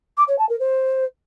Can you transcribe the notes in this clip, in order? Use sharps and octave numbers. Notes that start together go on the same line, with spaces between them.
D6
C#5
A5
A#4
C5